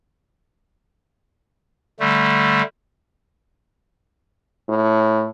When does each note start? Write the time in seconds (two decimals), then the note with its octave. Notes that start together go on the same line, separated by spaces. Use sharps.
2.00 D3 G3 A3
4.69 A2